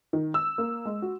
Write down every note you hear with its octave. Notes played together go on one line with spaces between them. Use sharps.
D#3
E6
A#3
G#3
F#4